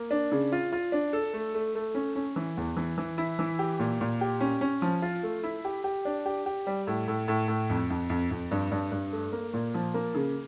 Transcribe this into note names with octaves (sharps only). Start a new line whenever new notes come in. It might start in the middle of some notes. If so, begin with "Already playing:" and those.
Already playing: A#3
D4
C#3
F4
F4
D4
A4
A3
A3
A3
C#4
C#4
E3
E2
E3
E3
E4
E3
G4
A#2
A#2
G4
C#4
C#4
F3
F4
A3
E4
G4
G4
D4
G4
G4
G3
A2
A2
A2
A2
F2
F2
F2
F2
G2
G2
G2
A3
A#3
A#2
F3
A#3
C#3